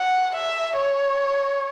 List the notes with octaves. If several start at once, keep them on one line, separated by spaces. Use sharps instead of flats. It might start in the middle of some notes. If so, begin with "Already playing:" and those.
Already playing: F#5
E5
C#5